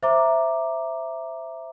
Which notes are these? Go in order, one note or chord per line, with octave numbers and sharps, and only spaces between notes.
C5 E5 A#5 D6